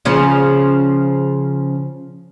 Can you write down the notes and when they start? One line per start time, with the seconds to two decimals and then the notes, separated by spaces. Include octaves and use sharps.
0.05 C#3 F3 C#4